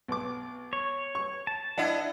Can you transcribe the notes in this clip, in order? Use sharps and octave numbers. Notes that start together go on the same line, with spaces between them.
B1 D6
C#5
C#6
A5
D4 E4 D#5 F#5